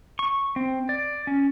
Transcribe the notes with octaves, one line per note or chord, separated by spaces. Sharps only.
C#6
C4
D5
C#4